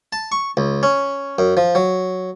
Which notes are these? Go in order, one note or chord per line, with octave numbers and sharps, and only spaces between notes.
A5
C#6
C#2
C#4
F#2
F3
F#3